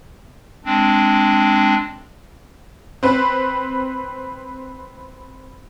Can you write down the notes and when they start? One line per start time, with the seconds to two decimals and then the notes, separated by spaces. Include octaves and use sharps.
0.65 G#3 C4 D4
3.03 C4 B4